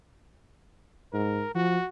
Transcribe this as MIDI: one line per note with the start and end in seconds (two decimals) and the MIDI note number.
1.13 1.43 44
1.13 1.51 70
1.55 1.78 53
1.55 1.88 66